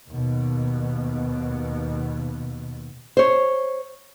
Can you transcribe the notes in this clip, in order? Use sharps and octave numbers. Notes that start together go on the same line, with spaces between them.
D#2 B2
C5 C#5